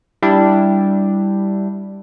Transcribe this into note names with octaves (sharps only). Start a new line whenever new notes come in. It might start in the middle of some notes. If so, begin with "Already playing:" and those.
G3 D4 E4 G4